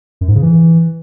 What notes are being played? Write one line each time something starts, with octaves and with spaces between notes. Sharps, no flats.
F#2
G#2
C#3
E3